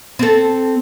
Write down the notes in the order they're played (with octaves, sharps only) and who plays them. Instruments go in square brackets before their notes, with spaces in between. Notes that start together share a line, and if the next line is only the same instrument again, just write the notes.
[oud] C4 A4